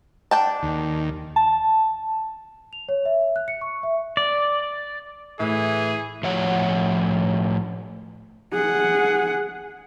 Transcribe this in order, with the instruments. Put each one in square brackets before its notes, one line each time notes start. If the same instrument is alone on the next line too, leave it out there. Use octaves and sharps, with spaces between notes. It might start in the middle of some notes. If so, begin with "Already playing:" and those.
[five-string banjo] D4 G5 A5
[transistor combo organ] D#2
[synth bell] A5
[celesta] F7
C#5
E5
F#6
C#7
C#6
E5
[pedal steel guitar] D5
[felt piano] A2 [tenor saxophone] E3 [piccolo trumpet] G#4
[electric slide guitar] A2 F3 C#5 F#5
[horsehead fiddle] G#4 F#5